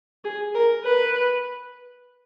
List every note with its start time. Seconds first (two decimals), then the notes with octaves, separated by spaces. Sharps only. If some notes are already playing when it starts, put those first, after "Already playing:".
0.24 G#4
0.54 A#4
0.84 B4